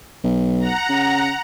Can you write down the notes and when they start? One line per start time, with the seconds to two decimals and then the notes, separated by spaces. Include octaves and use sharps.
0.24 B1
0.59 F#5 A#5
0.89 C#3